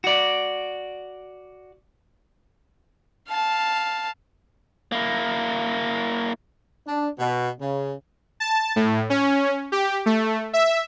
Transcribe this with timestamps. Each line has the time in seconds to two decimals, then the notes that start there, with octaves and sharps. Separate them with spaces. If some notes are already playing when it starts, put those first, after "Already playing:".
0.04 F#4 D5
3.28 F5 A5
4.92 A#3 E4
6.87 D4
7.19 B2
7.60 C#3
8.40 A5
8.76 A2
9.10 C#4
9.72 G4
10.06 A3
10.53 E5